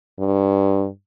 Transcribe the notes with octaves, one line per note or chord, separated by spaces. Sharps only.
G2